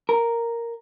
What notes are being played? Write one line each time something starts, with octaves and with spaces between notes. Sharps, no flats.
A#4